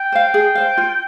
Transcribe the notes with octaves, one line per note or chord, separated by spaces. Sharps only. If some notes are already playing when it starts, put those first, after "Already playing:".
Already playing: G5
C5 F5
G#4
C5 F5
F4